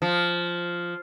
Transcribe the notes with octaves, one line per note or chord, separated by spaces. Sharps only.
F3